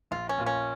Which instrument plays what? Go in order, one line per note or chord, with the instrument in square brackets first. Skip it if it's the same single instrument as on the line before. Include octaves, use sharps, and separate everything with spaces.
[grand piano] A#1 [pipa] F4
[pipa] C#4
[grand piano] A#2 A#3 F4
[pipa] C#4